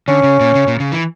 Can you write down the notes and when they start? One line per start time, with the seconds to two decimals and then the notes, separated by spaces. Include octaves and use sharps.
0.08 D3 C#4
0.23 C#3
0.40 A#2
0.55 C#3
0.68 A#2
0.80 C#3
0.92 E3